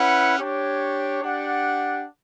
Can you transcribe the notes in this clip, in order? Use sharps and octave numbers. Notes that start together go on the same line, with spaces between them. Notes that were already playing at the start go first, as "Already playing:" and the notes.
Already playing: C#4 E4 B4 F#5
D4 G4 C#5
D4 G4 D5 F#5